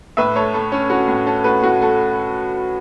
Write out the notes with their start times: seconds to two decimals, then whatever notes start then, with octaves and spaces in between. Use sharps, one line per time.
0.17 A2 B4 E5
0.35 A3 A4 C#5
0.54 A3 A4
0.72 C#4
0.90 C#4 F#4
1.08 A2
1.27 C#4 A4
1.44 A3 F#4 B4
1.62 A2 F#4
1.82 A3 A4